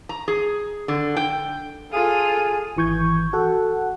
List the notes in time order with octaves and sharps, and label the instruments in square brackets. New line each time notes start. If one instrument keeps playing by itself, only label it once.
[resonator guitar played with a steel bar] A#5
G#4
D3
G5
[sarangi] F4 [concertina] G#4 [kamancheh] A4 [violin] D#7
[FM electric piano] G#1 E3 C#6 G6 G#6
F#4 A4 F#5